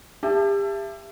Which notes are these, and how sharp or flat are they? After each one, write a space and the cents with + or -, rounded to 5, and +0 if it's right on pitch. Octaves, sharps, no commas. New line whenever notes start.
G4 +35 E5 +30 A5 +0